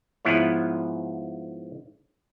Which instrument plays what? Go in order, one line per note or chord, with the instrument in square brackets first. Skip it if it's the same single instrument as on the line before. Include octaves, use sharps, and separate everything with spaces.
[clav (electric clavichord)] G#2 F3 B3 E4 B4 C#5